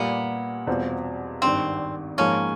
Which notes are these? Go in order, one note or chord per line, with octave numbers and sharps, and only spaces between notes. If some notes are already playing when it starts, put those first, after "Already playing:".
Already playing: A#2 G3 A#3 B3
E2 B2 G3 C4 F4
G#1 G2 D#3 C4
G#2 F3 A#3 C#4